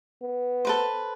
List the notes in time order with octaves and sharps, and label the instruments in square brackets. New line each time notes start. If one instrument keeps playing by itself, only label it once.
[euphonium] B3
[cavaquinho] A4 B4 C5